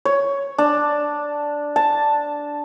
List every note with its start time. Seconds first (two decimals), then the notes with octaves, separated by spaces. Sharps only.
0.05 C#5
0.58 D4
1.76 A5